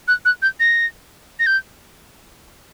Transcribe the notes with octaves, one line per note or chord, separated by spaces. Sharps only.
F#6
F#6
G6
A#6
A#6
G6